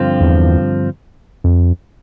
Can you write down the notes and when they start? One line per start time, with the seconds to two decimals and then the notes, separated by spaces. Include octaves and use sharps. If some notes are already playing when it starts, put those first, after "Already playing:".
Already playing: G2 D3 F3 C4 F4
0.20 E2
1.44 F2